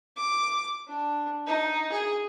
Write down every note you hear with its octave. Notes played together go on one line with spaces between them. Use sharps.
D6
D4
D#4
G#4